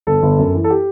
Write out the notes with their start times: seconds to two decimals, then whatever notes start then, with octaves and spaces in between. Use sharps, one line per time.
0.07 G1 A4
0.22 G1
0.39 F#2
0.55 E3
0.64 A4
0.70 G4